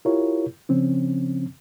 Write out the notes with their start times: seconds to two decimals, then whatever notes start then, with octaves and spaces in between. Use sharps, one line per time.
0.05 E4 F4 G4 A#4 C#5
0.69 C#3 F3 C4 C#4